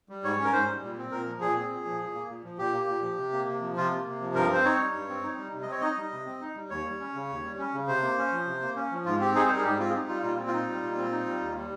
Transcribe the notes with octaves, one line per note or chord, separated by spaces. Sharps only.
G3
G#2 C#5
C#4
A#4
G#2 C5
G3
A#2
C4
A#2 A#4
F3
A#2 G#4
C4
A#2
F3
A#2
A#3
A#2
F3
A#2 G4
A#3
A#2
F3
C3
A#3
C3
F3
C3 F4
A#3
C3
F3
G2 A#4
C4 C5
D#4 C#5
G3
G2
C4
D#4
G3
C3
D#5
C4 C#5
D#4 D#5
G3
C3
C4
D#4
G3
D#2 C#5
G3
C#4
C#3
D#2
G3
C#4
C#3
C3 C5
A#3
C#4
F3
C3
A#3
C#4
F3
G#2 F4
C4 G4
D#4 G#4
C5
G3 A#4
G#4
G#2 G4
C4 F4
G#4
D#4 G4
G3 F4
A#2 F4
C4
F4
D#4
G3
A#2
C4
D#4
G3
D#2
G3